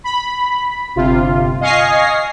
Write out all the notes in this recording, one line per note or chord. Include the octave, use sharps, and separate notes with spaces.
B5
G1 C3 F4
D#5 F5 G#5 C#6 A#6 C7